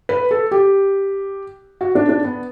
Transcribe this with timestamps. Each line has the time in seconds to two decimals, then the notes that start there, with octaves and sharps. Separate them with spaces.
0.09 B4
0.31 A4
0.51 G4
1.81 F#4
1.95 D4
2.09 D4
2.24 B3